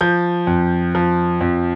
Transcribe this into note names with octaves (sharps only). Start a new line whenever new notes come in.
F3 G6
F2
F3
F2